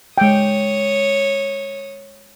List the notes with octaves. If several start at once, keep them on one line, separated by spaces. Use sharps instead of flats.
G#3 C#5 G5 D#6